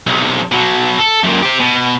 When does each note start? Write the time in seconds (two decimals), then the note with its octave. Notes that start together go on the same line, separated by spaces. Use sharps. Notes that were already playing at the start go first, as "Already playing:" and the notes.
0.07 B1 C3
0.52 B2 F#3
0.99 A4
1.24 F#2 A#2
1.43 G4 C5
1.60 B2